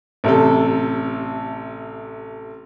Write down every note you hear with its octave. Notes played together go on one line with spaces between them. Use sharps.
A1 C3 A4